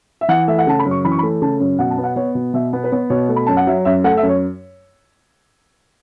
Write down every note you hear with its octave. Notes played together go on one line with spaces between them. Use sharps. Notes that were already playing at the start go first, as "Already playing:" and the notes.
E5
E3 F#5
A3 E5
F#5
C#3 A5
B5
F#2
C#6
E3 B5
C#6
B5
A3
C#3 A5
F#2
B2 F#5
A5
B3
F#5
B3 C#5
B2
B2 E5
B3
B4
B3 C#5
B2 C#5
A3
B5
F#2 A5
F#5
F#3 E5
F#2 E5
A3 F#5
E5
F#2
C#5